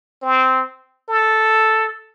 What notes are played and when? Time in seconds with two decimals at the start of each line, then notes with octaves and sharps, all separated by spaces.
0.22 C4
1.09 A4